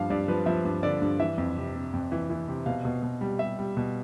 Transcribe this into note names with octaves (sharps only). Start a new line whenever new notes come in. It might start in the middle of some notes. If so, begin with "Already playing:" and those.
Already playing: G2 F3 F5
G2 D5
F3 B4
F3 E5
G2
D3 D5
G2
E3 E5
F2
C3
C3
F2
E3
E3
C3
B2 F5
B2
B2
G3
G3 E5
G3
B2